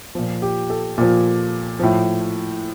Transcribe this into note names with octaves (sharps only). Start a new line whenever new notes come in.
A#2 F3
G4
A4
A#2 F3
A2 F3